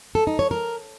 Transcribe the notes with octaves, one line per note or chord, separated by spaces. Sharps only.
A4
D#4
C#5
A#4